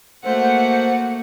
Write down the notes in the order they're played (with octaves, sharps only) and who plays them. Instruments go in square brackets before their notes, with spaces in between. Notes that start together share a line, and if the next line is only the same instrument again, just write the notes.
[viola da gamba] A3 A#3 [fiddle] F#4 F#5 [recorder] C5